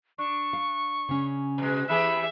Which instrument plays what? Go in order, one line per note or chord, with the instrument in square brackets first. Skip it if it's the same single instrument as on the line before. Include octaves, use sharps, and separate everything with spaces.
[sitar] D4 [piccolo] C#6
[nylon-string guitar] F5
C#3 C#4
[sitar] B2 G#3
[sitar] E3 G4 G#4 [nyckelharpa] E5 [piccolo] B5